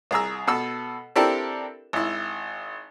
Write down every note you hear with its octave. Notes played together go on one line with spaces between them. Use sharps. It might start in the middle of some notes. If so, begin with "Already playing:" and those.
C2 G#4 A#5 E6
B2 A4 E6
C4 D4 E4 G4 A4 A#4
G#1 E4